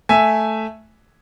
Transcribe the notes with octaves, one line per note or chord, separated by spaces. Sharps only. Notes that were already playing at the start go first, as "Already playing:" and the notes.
A3 E5 G#5